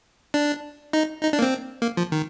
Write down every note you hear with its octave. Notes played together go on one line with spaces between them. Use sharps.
D4
D#4
D#4
D4
A#3
C4
A#3
F3
D#3